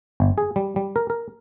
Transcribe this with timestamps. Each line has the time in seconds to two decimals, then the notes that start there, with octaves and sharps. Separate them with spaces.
0.20 G1
0.38 G#4
0.56 G3
0.76 G3
0.96 A#4
1.10 A#4